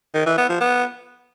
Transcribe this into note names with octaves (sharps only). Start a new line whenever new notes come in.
D#3
E3
B3
F3
B3